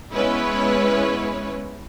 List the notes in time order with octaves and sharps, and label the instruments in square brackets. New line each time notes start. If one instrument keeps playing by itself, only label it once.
[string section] G#3 B3 C#4 E4 B4 C#5